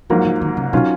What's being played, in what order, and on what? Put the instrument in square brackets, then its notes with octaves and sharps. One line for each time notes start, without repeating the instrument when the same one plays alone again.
[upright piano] G#2 F#3 A#3 F4 [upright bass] F3
[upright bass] F3
D#3
C#3
[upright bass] B2 [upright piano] D#3 F#3 C#4 F4